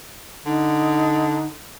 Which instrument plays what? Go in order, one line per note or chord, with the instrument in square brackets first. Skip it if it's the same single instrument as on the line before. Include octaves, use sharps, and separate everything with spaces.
[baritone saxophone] D3 [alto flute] D#4